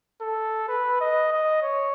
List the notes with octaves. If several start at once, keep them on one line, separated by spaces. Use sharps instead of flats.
A4
B4
D#5
D#5
C#5